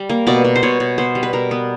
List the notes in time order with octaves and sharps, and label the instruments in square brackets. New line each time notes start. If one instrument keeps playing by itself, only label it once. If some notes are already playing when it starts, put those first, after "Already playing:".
Already playing: [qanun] G3
A#3
B2 D5
B2
C5
B2 C#5
B2
B3 C5
G3
B4
B2 A#4
B3